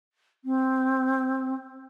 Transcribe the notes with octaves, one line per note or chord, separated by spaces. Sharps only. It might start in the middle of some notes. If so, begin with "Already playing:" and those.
C4